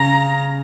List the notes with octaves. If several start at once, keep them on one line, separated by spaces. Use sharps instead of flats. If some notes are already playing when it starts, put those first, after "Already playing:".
Already playing: C#3 A#5